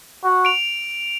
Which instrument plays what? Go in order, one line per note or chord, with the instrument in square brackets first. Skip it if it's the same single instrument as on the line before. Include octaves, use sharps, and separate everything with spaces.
[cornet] F#4
[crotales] D7 F7